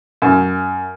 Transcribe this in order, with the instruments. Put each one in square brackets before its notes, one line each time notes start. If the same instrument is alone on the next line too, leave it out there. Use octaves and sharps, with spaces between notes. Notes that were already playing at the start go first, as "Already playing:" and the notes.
[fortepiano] F#2